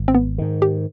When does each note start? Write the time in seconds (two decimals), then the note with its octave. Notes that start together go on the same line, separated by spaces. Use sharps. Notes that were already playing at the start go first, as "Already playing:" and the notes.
Already playing: G#1
0.08 C4
0.15 B3
0.38 G#2 D#3
0.62 G4